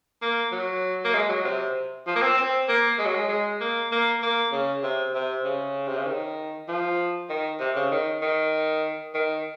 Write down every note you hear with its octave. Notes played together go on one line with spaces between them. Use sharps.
A#3
F#3
A#3
G#3
F#3
C3
F3
A#3
C4
C4
A#3
G#3
F#3
G#3
G#3
A#3
A#3
A#3
C#3
C3
C3
C#3
C3
C#3
D#3
F3
D#3
C3
C#3
D#3
D#3
D#3